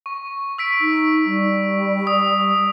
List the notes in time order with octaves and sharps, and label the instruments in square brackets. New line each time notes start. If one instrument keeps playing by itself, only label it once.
[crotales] C#6
E6 B6 D7
[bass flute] D#4
G3
[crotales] D#6